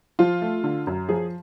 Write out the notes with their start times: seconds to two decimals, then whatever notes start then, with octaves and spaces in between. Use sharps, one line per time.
0.19 F3 F4
0.42 A3
0.64 D3
0.87 F#2
1.09 F3 G#4